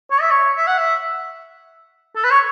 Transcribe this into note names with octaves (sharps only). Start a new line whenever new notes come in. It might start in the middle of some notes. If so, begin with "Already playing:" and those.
C#5
E5
C#5
E5
F#5
E5
A4
B4
C#5